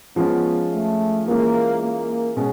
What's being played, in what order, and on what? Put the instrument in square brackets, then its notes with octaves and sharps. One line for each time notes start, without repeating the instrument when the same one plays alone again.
[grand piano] F3 G#3 C#4 F4 [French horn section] B3
[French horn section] A3
[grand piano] E3 G#3 C#4 F4 G#4 [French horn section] A#3
[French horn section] A#3
[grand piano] B2 G#3 C#4